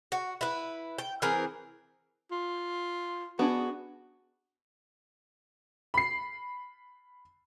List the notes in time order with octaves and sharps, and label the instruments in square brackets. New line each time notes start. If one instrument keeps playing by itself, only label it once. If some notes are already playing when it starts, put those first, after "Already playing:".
[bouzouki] F#4
E4 B4
G5
E3 C4 G#4 A#4
[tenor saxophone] F4
[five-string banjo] B3 D4 G#4 [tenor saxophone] F#4
[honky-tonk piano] B5 C7